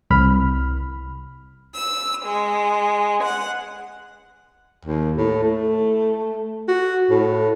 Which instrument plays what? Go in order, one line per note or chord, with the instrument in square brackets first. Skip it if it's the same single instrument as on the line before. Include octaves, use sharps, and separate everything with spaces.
[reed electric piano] C2 B5 F6
[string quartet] E6
G#3
F#5
[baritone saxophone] D#2
A2
A3
F#4
A2